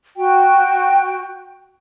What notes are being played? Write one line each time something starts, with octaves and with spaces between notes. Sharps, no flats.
F#4 G5